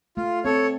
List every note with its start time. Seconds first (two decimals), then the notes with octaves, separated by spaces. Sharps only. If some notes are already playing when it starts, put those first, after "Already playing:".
0.17 A3 F4
0.45 C4 A4 C#5